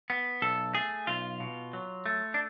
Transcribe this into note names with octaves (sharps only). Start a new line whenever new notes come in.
B3
B1 A4
A3 G#4
B1 F4
B2
F#3
A3
D4